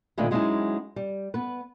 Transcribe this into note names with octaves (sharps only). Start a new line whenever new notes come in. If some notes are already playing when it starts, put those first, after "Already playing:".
A#2 D3 D#3 G#3 A3 B3
F#3 G#3 C4 C#4 D#4 E4
G3
B3 B4